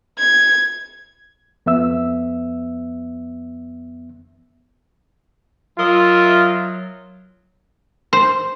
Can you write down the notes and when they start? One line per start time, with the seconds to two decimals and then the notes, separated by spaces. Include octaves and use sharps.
0.19 G#6
1.66 F2 B3 E5 E6
5.78 F#3 F4 A#4 D#5 E5
8.13 C5